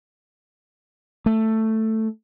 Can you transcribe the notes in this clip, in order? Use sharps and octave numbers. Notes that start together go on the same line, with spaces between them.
A3